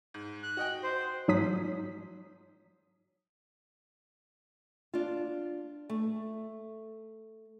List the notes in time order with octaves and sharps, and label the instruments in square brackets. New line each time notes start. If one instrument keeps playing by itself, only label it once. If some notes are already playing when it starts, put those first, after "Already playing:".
[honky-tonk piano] G#2
[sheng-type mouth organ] F#6
[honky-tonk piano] F#4 D#5 G5
[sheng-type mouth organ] C5
[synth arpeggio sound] G#2 F3 F#3 D#6 B6
[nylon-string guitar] D4 F4
A3